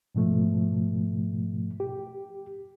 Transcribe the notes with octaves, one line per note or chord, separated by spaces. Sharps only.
G#2 B2 F3 A3
G4